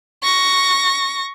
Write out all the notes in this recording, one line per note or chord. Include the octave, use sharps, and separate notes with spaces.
C#6 A#6